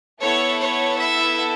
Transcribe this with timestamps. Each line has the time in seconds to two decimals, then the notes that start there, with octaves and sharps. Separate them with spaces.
0.20 B3 E4 A4 C#5
0.59 C#5
0.98 E5